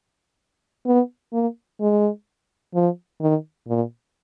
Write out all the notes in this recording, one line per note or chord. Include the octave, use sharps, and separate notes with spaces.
B3
A#3
G#3
F3
D#3
A#2